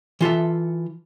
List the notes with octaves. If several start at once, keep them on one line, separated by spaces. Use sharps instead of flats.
E3 F4 A4 E5